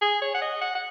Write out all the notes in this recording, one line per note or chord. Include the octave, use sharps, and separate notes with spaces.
G#4
C#5
F#5
D#5
F#5
F#5